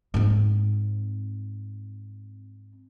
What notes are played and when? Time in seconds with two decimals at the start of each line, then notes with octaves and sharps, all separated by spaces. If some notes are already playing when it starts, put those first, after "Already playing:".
0.14 G#2 C4